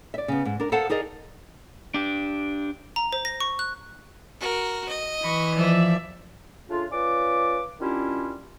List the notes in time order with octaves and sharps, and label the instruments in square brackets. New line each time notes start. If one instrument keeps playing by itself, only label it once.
[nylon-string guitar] D5 E5
C#3 B3
G#2
D4 A#4
A4 A#4 C5 F5 F#5 A5
D#4 G#4 A#4 D5 D#5
[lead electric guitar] D4 G4
[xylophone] A#5
C5
A#6
C#6
F#6
[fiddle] F#4 A#4
D#5
[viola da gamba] E3 [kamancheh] B5 C#6
[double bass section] F3 [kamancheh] D5 E5
[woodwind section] C#3 A3 D4 F4
C#4 F4 B4 D5 D6
D#3 G3 C#4 D4 E4 F4